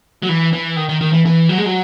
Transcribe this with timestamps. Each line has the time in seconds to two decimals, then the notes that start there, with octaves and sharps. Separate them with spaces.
0.23 F#3
0.29 E3
0.53 E3
0.77 D#3
0.89 D#3
1.01 D#3
1.13 E3
1.25 E3
1.49 F#3
1.58 G#3
1.66 F#3